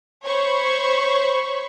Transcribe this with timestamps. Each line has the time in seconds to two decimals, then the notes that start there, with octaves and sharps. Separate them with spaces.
0.24 C5 C#5 B5 C#6